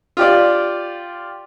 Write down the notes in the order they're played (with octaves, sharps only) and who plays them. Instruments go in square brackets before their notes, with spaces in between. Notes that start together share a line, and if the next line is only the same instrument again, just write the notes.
[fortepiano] F4 G4 D5